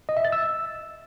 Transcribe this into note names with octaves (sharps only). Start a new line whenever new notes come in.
D#5
E5
A6
E6